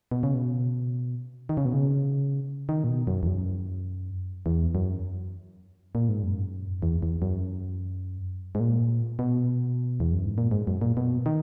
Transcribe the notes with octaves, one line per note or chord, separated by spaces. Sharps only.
B2
C#3
B2
D#3
C#3
B2
C#3
D#3
A#2
B2
F#2
E2
F#2
E2
F#2
A#2
G#2
F#2
E2
E2
F#2
G#2
A#2
B2
E2
F#2
G#2
A#2
G#2
F#2
A#2
B2
D#3